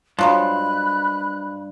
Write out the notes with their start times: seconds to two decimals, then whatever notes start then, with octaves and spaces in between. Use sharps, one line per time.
0.19 G2 F3 F#3 G#3 B5 F#6